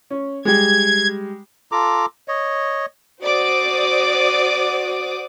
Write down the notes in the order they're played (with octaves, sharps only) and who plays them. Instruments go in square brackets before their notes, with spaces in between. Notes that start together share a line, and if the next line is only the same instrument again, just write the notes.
[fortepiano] C#4
[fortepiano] G3 G#3 [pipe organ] G#6
[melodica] F4 A4 A#5 D6
C#5 D#5
[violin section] F#4 C5 D5 D6 D#6